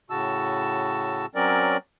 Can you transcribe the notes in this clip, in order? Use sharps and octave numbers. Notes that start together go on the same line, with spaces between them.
A2 C#3 F#4 A5 E6
F#3 C4 C#4 A#4 D5